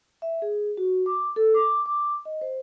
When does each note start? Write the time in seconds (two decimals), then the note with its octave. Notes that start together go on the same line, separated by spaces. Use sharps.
0.22 E5
0.42 G#4
0.77 F#4
1.06 D6
1.36 A4
1.54 D6
1.86 D6
2.25 D#5
2.41 C5